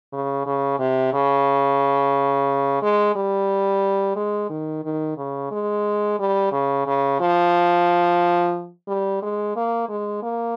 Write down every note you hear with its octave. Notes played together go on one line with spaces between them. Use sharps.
C#3
C#3
C3
C#3
G#3
G3
G#3
D#3
D#3
C#3
G#3
G3
C#3
C#3
F3
G3
G#3
A#3
G#3
A#3